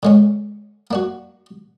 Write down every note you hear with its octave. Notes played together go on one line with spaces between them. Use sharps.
D3 G#3 C#4
A#3 D4 F#4